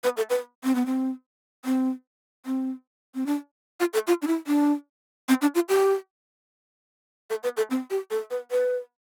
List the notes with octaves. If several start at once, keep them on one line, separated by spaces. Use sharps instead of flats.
B4
A4
B4
C4
B3
C4
C4
C4
C4
D4
F4
A4
F4
D4
E4
D4
C4
D4
F4
G4
A4
B4
A4
C4
G4
A4
B4
B4